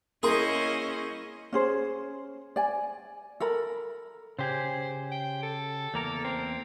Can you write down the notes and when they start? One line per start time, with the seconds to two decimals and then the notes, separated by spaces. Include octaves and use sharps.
0.23 A#3 C#4 E4 G#4 C5 D#5 C6
1.53 C#4 G#4 C5
2.56 D5 G#5
3.40 A4 A#4 B5
4.39 C#3 G4 G#4 C5
5.11 G5
5.43 A4
5.94 E2 A#3 A#4
6.24 C4